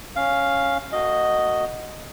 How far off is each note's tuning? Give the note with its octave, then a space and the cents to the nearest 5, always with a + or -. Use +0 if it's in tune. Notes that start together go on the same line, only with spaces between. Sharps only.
C#4 -5 F5 +0
A#3 -45 F#4 +0 D#5 +0